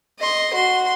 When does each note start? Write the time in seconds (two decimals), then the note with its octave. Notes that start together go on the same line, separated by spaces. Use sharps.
0.19 D#5 C6
0.54 F#4 C6